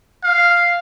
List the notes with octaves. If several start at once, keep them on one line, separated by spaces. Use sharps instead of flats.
F5